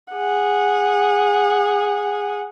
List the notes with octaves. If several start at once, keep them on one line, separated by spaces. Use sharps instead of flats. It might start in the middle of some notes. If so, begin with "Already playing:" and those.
G#4 F#5